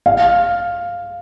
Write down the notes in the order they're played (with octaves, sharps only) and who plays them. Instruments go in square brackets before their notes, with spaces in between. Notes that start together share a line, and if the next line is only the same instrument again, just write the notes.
[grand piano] F5